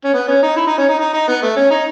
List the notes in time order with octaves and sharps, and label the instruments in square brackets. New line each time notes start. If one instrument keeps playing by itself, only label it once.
[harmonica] C#4
B3
C#4
D#4
E4
D#4
C#4
D#4
D#4
D#4
B3
A3
C#4
D#4